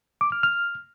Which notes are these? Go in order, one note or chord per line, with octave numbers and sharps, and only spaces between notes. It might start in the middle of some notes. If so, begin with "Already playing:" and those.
D6
F6
F6